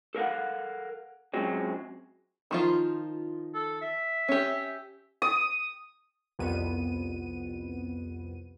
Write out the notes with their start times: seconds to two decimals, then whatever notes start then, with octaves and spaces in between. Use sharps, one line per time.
0.15 A4 A#4 F5 F#5
1.34 F#2 F3 F#3 G#3 C4
2.51 D#3 F3 F4
3.54 A4
3.82 E5
4.28 C#4 G4
5.22 D#6
6.39 C2 F2 B3 D#7